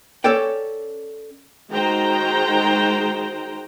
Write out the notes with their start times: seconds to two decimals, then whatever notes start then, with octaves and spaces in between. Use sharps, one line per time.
0.24 C#4 A4 C#5 D5 G5
1.71 D#3 G#3 F#4 C5 G5 A#5